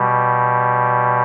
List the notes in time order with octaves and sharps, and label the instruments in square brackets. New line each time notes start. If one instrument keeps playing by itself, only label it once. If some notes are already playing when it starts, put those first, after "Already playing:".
Already playing: [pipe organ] B2 G3